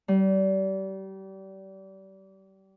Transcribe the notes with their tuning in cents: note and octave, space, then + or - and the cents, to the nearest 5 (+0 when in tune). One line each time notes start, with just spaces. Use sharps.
G3 -30